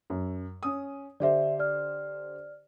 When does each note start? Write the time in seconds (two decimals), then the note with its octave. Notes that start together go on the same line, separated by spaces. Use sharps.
0.10 F#2
0.63 C#4 D#6
1.20 D3 G4 C5 D5 E5
1.59 D5 F6